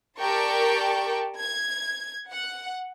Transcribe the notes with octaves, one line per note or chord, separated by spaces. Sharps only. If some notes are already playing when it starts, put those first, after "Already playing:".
G4 A#4 D5 G5 A5 C#6
G#6
F#5